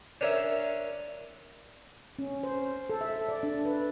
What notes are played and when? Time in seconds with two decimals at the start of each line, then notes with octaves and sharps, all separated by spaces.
0.21 C#4 D4 A#4 C#5 E5
2.19 C#4
2.43 C5
2.90 A4
3.01 E5
3.29 D5
3.43 D4
3.65 B4